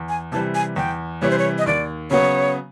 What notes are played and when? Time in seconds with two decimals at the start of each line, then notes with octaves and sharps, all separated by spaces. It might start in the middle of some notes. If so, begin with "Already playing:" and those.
Already playing: E2
0.09 G#5
0.32 C3 E3 G3 A5
0.55 G#5
0.76 E2 G5
1.22 C3 E3 G3 C#5
1.30 C5
1.38 C#5
1.58 D#5
1.66 D#2 D5
2.11 C#3 F#3 B3 C#5